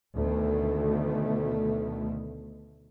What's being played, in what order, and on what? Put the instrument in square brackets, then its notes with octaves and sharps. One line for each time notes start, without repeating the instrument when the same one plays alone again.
[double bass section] D2 B2 D#3 A3